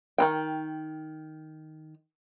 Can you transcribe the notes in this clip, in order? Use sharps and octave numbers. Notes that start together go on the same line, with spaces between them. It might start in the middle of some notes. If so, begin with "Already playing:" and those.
D#3 D#4 G5